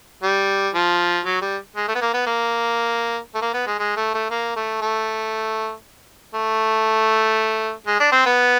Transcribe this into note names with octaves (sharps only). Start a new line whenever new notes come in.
G3
F3
F#3
G3
G#3
A3
B3
A#3
B3
A#3
A3
A#3
B3
G#3
G#3
A3
A3
A#3
A3
A3
A3
G#3
D4
C4
B3